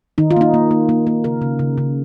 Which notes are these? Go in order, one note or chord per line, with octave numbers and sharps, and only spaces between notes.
D#3 D#4
F4
A#3 D#4
A#3
A#3
A#3
A#3
C#3 A#4
C#3
C#3
C#3